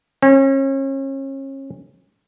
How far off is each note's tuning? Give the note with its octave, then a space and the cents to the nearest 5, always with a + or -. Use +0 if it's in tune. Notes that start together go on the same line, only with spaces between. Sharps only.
C#4 -35